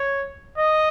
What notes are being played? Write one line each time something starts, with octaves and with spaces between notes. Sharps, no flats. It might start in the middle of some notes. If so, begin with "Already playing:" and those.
Already playing: C#5
D#5